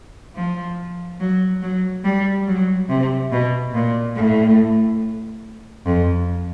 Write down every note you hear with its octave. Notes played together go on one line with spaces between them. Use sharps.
F3
F#3
F#3
G3
F#3
C3
B2
A#2
A2
F2